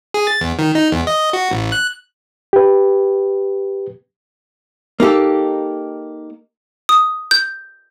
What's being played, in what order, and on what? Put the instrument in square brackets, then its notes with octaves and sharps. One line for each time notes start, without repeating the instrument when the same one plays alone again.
[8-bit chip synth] G#4
A6
E2
D#3
D#4
E2
D#5
F#4
A1
F#6
[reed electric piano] G4 B4
[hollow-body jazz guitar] A#3 D#4 G4 A4
[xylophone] D#6
G6